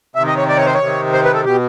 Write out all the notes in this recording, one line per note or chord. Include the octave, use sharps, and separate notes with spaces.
C3 D#3 E5
D#5
C#5
D5
C#5
C5
C#5
C3 D#3
C5
B4
A4
B2 G4